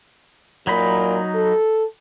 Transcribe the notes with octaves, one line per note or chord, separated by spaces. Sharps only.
A#2 F#3 D#4 B5
A4